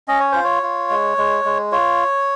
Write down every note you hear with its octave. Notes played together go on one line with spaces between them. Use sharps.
C#4 D#5
C#5
F4 C5
C#5
F4
G#3
G#3
G#3
F4 C#5